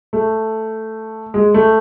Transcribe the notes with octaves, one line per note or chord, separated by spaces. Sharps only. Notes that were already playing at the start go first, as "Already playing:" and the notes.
A3
G#3
A3